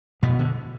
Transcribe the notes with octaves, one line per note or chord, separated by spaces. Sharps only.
F2 B2 B3
D3